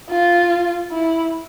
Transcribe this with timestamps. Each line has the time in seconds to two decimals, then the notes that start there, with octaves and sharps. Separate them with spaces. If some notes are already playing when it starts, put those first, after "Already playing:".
0.10 F4
0.91 E4